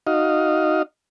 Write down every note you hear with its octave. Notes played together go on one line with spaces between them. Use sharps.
D#4 F#4 D#5 F5